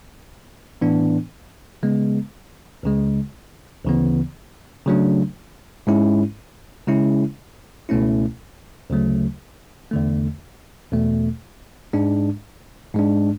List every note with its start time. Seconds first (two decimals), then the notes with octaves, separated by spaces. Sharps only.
0.81 A2 E3 B3 D4
1.83 C#3 G#3 B3
2.83 C#2 C#3 G#3
3.85 D2 C#3 E3 B3
4.86 C#3 F#3 A3 D4
5.87 G#2 G#3 C#4 E4
6.88 C#3 G#3 C#4 E4
7.89 C#2 B2 A3 C#4 E4
8.90 D2 C#3 F#3 A3
9.91 E2 D3 A3
10.92 E2 B2 A3
11.93 G#2 G#3 D4
12.95 G#2 G#3 D4